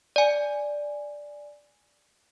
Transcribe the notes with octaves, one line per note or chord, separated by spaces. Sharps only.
D5 G#5